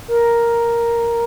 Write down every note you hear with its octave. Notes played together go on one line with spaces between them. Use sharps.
A#4